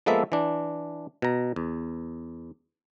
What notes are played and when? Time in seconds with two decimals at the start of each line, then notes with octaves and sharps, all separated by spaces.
0.06 F3 G#3 A#3 B3 A4 E5
0.32 E3 D4
1.22 B2 A#5
1.56 E2